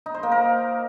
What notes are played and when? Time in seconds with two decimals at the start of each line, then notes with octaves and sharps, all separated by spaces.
0.06 D#4
0.14 C5
0.23 A#3
0.32 A#4